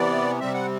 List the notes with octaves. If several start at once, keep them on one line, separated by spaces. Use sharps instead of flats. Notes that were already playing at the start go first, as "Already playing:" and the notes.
Already playing: C3 E3 B3 D5
C3 G3 C4 E5
F#5